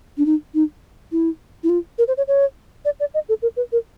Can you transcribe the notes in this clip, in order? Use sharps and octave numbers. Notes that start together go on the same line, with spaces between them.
D4
D#4
D#4
E4
E4
F4
A#4
C5
C#5
C#5
D5
D5
D#5
A4
A#4
B4
A#4